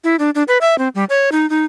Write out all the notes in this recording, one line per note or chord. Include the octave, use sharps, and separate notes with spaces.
E4
D4
D4
B4
E5
C4
G3
C#5
D#4
D#4